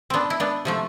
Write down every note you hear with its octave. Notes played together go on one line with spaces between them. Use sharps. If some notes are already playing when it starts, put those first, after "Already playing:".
B3 C4 D4
E4
B3 D4
C3 F3 A3